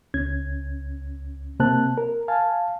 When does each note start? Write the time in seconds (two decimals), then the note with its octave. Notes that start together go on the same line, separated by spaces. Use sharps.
0.14 C#2 C#4 G#6
1.60 C3 A#3 C4 A5 F#6
1.98 A#4
2.28 F5 G#5 A5